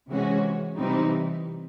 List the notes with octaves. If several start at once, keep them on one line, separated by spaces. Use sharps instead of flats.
C3 E3 G#3 C#4 F#4
C3 E3 G3 C4 D#4